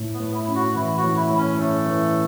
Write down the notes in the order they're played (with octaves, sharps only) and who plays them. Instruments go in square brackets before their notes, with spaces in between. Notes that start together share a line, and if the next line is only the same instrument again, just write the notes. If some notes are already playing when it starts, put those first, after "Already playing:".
Already playing: [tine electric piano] A2
[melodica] B3
[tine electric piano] A2
[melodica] E4
[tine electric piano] C#4
[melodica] F#4
[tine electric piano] E3 [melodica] E4
[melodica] F#4
[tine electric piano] A2
[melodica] E4
[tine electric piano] A2
[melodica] C#4
[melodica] A3 [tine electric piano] C#4
[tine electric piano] E3